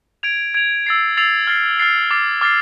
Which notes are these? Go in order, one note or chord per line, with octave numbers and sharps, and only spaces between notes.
G#6 D7 F7
G#6 D7 F7
E6 A6 C7 F7
E6 A6 C7 F7
F6 A6 C7
F6 A6 C7
D6 F6 A6 C7
D6 F6 A6 C7